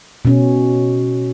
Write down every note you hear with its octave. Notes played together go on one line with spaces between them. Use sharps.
B2 C#4